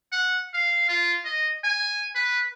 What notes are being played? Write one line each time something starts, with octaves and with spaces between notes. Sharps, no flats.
F#5
F5
F4
D#5
G#5
B4